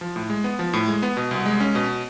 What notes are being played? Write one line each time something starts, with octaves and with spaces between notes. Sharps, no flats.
F3
A2
G#3
B3
F3
A2
G#3
B3
B2
C2
G#3
C#4
B2